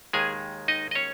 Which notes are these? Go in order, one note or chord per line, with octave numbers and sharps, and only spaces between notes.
D#2 D#3 G#3 G#4 G#5
D#4 D#5
D#5
C#4 C#5